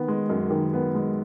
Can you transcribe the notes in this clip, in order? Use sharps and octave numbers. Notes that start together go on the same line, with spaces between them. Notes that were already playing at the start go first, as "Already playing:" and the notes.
Already playing: D#3 B3
G#3
F#2
D#3
B3
G#3